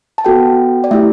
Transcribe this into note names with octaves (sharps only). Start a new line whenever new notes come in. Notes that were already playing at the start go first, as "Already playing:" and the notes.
A5
B3 F#4 A4 G5
D5
A3 E4 G4 E5